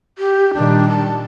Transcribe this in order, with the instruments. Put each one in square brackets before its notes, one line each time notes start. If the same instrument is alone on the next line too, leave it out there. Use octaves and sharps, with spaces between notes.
[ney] G4
[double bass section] A#2 D#3 G3 [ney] D4
[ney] A5